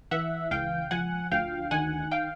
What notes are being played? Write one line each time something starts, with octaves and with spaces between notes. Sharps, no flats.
E3 E5 F#5
C#2 F5 G5
F3 F#5 G#5
D2 F5 G5
D#3 F#5 G#5
F5 G5